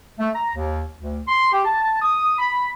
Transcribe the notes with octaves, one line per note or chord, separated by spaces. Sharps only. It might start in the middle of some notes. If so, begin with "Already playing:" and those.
A3
A#5
D#2
D2
C6
G4
A5
D#6
B5